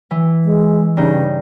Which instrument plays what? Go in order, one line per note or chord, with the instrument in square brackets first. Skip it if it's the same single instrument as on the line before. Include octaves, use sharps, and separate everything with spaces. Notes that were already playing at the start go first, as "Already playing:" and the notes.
[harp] E3
[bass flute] G#3
[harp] G2 D#4 [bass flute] C#3